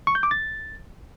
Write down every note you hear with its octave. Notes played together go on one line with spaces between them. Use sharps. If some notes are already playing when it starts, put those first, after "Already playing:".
C#6
G6
D6
A6